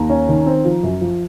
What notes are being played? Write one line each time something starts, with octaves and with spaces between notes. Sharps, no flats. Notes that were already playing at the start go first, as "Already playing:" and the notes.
Already playing: D#2 A#5
C#4
D#3
C4
F3
F#2
F3